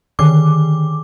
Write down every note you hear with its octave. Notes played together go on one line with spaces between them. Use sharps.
D3 D#3 D6